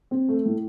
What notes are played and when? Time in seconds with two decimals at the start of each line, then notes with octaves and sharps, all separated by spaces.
0.11 C4
0.29 A3
0.45 A2